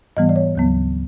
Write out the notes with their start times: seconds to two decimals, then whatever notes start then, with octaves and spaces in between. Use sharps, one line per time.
0.17 G#2 E3 G3 B3 D#5
0.29 D5
0.36 C#5
0.55 D2 C#3 F#3 B3